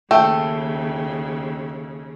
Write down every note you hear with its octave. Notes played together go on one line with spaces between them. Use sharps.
D#2 C#3 A3 G5